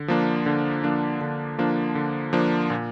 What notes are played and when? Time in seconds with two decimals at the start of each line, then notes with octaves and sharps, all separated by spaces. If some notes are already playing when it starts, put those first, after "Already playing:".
Already playing: D3
0.08 F3 A#3 D4
0.46 D3
0.83 F3 A#3 D4
1.21 D3
1.58 F3 A#3 D4
1.95 D3
2.33 F3 A#3 D4
2.70 A#2